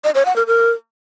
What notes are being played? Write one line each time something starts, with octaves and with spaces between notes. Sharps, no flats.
D#5
C#5
F#5
A#4
A#4